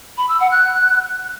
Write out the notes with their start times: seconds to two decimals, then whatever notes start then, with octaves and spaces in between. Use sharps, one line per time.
0.18 B5
0.29 E6
0.40 F#5
0.51 F#6